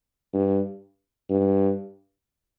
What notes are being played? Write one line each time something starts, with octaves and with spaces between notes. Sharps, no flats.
G2
G2